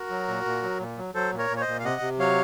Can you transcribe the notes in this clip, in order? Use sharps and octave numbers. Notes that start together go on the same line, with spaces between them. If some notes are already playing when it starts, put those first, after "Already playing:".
Already playing: F#4 A#4
F#3
A#2
A#2
F#3
A#2
F#3
F#3 A4 C5
A#2
A#4 C#5
A#2
C#5
C5 D#5
A#2
F5
C3 D#5 F#5
C3
F#3 C#5 F5